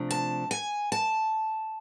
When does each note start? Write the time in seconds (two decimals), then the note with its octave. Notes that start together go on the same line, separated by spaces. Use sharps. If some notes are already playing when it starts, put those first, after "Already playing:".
Already playing: C3 F3 A3 D4
0.11 A5
0.51 G#5
0.92 A5